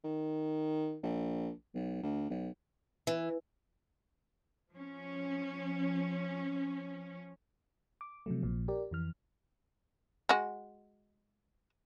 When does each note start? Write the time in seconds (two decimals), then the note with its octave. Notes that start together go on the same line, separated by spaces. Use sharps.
0.04 D#3
1.03 A#1
1.75 B1
2.03 D2
2.30 B1
3.07 E3
4.71 F3 C#4
8.01 D6
8.26 C3 F3 F#3 A3
8.43 A#1 A#2 F3
8.68 G4 A#4 D5
8.91 F2 E3 F6
10.29 G#3 F#4